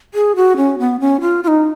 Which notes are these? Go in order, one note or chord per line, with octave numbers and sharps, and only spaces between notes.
G#4
F#4
C#4
B3
C#4
F4
F4
D#4